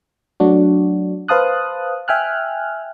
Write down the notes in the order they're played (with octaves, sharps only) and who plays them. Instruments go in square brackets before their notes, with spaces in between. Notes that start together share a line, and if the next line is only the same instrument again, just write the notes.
[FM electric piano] F#3 A3 D4 F#4
B4 C5 F5 A5 D#6 F#6
E5 G5 G#5 F6 F#6